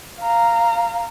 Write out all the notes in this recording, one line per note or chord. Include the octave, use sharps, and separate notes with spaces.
F5 A#5